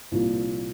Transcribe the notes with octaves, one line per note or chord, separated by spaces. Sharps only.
C2 A#2 F3